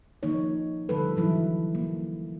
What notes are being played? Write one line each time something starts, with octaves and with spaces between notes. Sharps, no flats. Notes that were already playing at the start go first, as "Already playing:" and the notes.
D#3 F3 A#3 D#4 C#5
D3 F3 G3 A3 A4 B4
D3 E3 F#3 E4
A#3